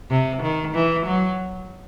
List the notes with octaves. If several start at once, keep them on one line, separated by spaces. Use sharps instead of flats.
C3
D#3
E3
F#3